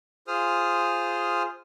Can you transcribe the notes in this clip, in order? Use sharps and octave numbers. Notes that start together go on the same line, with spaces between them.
F4 G#4 C5 D#6 F6